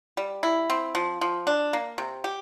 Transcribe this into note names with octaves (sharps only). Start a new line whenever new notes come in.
G3
E4
C4
F3
F3
D4
A#3
C3
G4